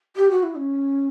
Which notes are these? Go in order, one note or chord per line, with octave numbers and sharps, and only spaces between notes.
G4
F#4
E4
C#4